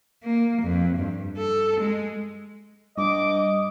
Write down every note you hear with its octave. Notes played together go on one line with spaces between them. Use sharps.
A#3
F2
G2
A4
G#3
G2 D#5 D6